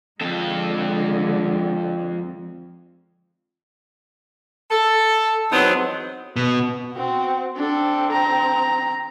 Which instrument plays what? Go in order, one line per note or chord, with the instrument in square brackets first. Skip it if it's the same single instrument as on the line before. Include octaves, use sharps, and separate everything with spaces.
[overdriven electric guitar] F2 A4 [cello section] D3 G#3
[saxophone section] A4
E2 F#3 B3 C4 D#4
[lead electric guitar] B2
[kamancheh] C4 F#4
[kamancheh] C4 [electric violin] D4 A4
[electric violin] A#5